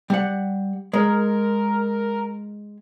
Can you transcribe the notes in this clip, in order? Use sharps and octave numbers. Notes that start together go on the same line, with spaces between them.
G3 F#5
G#3 A#4